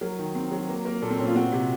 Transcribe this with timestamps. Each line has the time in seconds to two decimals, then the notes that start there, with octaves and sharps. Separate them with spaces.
0.01 F#3 A#4
0.19 D#3
0.35 C4
0.52 F#3
0.69 A#3
0.85 A#3
1.02 A#2 A4
1.11 C4
1.19 A#2 C#4
1.27 F4
1.36 C4 F#4
1.52 C3